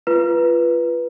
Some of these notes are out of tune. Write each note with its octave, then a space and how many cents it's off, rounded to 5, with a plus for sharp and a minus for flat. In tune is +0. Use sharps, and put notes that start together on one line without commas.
F4 -20 B4 -10